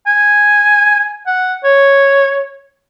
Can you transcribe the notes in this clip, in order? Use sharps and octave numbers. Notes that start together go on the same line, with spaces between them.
G#5
F#5
C#5